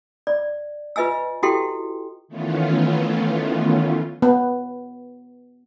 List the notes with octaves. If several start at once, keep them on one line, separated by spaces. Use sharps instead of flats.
D5
F4 B4 D#5 G#5 E6
E4 F#4 G4 A4 G5 C6
D#3 E3 A3 B3 C#4 F4
B3